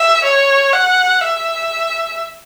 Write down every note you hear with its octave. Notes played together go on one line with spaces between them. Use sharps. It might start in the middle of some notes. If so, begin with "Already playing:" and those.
Already playing: E5
C#5
F#5
E5